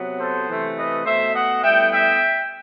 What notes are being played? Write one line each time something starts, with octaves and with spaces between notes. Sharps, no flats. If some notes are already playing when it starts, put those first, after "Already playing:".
Already playing: C3 F#3 B3
A4 C5
C3 E3 A3
B4 D#5
B2 A3 C5 E5
D#5 F#5
A2 G3 B3 E5 G5
E5 G5